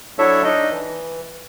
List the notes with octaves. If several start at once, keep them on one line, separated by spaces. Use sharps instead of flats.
F#3 D4 E4 A4 C#5 E5
D4 D#4 D#5
E3